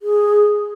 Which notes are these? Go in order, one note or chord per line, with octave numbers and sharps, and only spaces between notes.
G#4